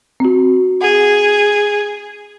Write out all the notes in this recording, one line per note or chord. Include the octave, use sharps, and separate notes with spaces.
C4 F#4
G#4 F#5